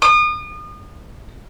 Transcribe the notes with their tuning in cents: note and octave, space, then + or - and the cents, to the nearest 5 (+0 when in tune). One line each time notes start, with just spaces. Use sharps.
D#6 -35